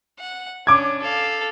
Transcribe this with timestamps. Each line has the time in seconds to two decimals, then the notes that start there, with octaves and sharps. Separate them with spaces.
0.19 F#5
0.67 C#4 D4 D6 G#6
1.02 A4 F5